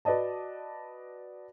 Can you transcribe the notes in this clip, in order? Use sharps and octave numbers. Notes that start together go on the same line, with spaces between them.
F#4 B4 D5 D#5 A5